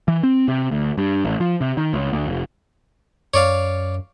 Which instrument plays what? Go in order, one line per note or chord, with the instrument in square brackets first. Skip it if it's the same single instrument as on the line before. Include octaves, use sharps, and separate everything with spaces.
[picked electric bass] E3
C4
C3
D2
G2
A1
F3
C3
D#3
C#2
D2
F1
[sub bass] F#2 [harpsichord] C#5 D5 F5